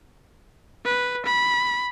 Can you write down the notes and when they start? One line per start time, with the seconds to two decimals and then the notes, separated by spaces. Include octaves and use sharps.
0.85 B4
1.25 B5